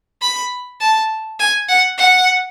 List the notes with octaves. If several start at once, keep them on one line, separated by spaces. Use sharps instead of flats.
B5
A5
G#5
F#5
F#5